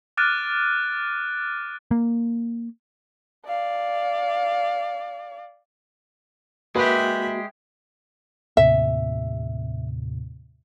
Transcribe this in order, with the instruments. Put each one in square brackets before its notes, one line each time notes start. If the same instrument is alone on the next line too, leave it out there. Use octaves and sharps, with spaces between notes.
[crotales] D6 F6 F#6 A6 D7 D#7
[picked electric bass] A#3
[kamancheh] D5 F5
[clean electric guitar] G#3 G4 [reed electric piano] A#3 F#4 [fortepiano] B4 [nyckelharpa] E5 B5
[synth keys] D#2 A2 C3 [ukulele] E5